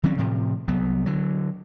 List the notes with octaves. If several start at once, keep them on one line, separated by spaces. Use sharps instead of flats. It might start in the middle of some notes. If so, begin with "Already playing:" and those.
D#3 F#3 C4 C#4
A2 C3 F3
C2 F#3 B3
D3 F#3